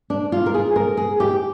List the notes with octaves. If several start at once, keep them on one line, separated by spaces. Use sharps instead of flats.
D4
F4
A#4
G#4
A#4
G#4
G4